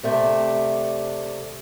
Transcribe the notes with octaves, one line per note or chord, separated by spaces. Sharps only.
C3 A3 D4